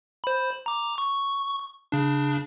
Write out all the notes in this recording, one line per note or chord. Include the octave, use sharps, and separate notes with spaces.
C5 B5
A#5 D6
C#6
C#3 D4